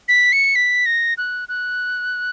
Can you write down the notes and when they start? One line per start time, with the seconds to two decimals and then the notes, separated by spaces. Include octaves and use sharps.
0.08 B6
0.33 C#7
0.56 B6
0.86 A#6
1.18 F#6
1.49 F#6